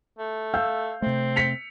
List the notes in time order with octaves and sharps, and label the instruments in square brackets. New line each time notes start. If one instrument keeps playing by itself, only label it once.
[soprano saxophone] A3
[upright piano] F5 E6 G6
[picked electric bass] C3 A3 [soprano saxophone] C4
[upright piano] B6 C#7 F7